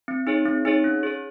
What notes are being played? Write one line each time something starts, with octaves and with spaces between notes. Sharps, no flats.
C4
D#4 G#4 C#5
C4
D#4 G#4 C#5
C#4
G#4 C#5